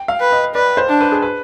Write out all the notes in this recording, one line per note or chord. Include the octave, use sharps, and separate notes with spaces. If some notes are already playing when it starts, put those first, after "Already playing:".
Already playing: G5
F5
B4
D#5
B4 D5
C5
D4
B4
G#4
B4